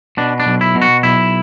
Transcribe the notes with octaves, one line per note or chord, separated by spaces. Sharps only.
B2 D4
D4
B1
E4
B2
F#4
B1 E4